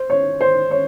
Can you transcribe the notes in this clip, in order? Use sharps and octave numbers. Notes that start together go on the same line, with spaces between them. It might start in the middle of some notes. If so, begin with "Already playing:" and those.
Already playing: C5
C#5
C5
C#5